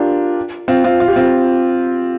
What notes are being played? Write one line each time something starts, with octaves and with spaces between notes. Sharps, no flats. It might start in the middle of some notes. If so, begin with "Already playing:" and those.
Already playing: D4 F4 G4 A#4
C4 F4
C4 F4
F4
G4
C4 F4